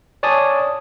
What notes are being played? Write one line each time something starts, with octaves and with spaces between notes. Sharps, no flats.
C#5 D5 G#5 A5 D#6